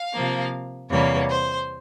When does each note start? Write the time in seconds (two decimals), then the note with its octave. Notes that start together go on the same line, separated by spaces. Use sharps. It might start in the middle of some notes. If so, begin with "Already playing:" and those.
Already playing: F5
0.14 C3 F3 A#3
0.90 E2 C3 G3 A#3 C#5
1.29 C5